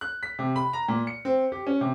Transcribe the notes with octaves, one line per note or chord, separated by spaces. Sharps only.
F#6
B6
C3
B5
A#5
A#2
C#7
C4
G4
C#4
C3